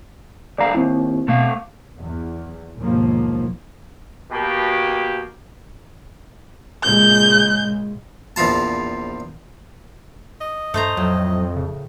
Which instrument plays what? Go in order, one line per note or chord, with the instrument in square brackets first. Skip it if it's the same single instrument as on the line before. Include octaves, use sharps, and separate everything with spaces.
[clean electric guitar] D2 G2 F5 [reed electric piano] D5 A#5
[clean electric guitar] D#2 [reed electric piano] C4 E4
[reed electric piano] B2 [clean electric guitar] A3 C4 F5
[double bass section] E2
A#1 D#2 G#2 B2 F3 A#3
[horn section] B2 A#3 G4
[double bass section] A#2 C#3 G#3 [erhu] G6
[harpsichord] A#1 E2 F3 F4 A5
[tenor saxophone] D#5
[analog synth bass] G2 [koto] A3 C5 A#5
[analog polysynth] F2 [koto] A2 [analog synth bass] F#3
[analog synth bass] C#3